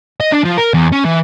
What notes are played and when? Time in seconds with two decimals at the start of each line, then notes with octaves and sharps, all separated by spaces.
0.20 D#5
0.32 D4
0.45 F3
0.58 A#4
0.74 E2
0.92 C#4
1.05 E3